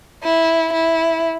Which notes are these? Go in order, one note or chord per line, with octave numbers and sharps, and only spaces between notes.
E4
E4